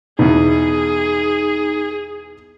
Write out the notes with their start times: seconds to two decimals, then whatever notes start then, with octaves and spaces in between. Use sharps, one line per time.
0.19 E2 B2 D#4 G#4